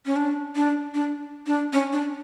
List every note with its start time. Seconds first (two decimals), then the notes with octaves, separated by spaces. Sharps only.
0.06 C#4
0.16 D4
0.56 D4
0.95 D4
1.47 D4
1.73 C#4
1.92 D4